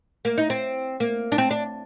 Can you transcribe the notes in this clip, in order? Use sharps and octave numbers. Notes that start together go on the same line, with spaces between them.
A#3
D#4
C4
A#3
D4
C4
D4